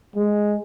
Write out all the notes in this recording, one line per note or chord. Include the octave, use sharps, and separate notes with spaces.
G#3